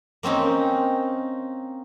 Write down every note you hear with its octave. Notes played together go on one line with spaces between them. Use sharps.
A#3 C4 C#4 D#4